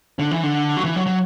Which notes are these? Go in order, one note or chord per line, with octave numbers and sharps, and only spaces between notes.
D3
E3
D3
F#3
E3
F#3
F#3